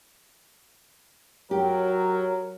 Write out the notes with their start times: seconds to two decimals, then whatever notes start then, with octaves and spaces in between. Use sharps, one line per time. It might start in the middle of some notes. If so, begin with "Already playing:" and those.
1.51 F#3 G4 A#4